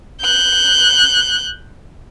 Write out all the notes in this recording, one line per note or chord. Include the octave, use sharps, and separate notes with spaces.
F#6 G6